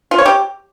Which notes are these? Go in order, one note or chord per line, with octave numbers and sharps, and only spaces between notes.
F4
C#5
G4